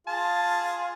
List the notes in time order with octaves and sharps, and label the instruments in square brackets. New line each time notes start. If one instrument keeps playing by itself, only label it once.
[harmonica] F4 G#4 [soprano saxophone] A5